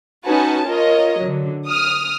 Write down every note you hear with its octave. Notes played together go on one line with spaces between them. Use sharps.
C#4 D#4 F#4 B4 G#5 A5
F4 A#4 C#5 D#5
D3 F#3
D#6 F6